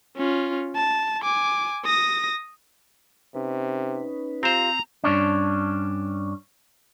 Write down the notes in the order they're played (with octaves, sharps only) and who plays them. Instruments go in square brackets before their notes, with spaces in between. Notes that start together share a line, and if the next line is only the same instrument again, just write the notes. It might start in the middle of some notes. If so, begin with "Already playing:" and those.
[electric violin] C#4 F4
A5
G#5 D6
D#6 A#6
[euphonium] C3 [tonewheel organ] C#4 D#4 B4
[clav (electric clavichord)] C4 C5 [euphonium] F4 [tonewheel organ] G4 [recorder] A#5
[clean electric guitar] G2 C#4 D4